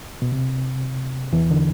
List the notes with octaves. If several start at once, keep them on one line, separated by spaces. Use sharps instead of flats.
B2
C3
E2 E3
D3